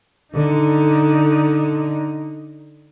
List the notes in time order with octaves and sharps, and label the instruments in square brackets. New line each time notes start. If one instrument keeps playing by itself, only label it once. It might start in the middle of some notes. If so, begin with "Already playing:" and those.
[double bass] D3 D#4